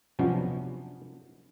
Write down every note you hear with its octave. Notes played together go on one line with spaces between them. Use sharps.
C3 F3 F#3 B3 C#4 D4